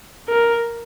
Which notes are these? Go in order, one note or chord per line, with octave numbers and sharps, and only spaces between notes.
A#4